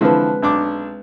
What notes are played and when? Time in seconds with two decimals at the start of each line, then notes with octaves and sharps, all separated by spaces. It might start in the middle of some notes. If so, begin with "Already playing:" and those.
0.01 D3 E3 F3 G#3 C4 B4
0.42 B1 D4 D6